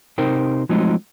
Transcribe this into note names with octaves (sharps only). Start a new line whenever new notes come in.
C3 D#4 A#4 C5 G5
F3 F#3 G#3 A3 C4 D#4